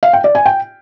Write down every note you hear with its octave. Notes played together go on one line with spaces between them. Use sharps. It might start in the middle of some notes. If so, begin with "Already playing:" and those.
F5
G5
D5
G#5
G5